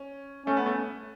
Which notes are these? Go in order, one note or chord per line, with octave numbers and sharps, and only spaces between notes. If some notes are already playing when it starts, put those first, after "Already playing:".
Already playing: C#4
A3 C#4
B3
A3